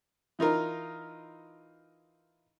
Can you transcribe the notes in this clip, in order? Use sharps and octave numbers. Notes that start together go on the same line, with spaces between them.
E3 D#4 F4 A#4